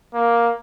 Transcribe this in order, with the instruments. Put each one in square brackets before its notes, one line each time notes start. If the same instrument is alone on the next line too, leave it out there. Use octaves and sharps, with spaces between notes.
[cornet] A#3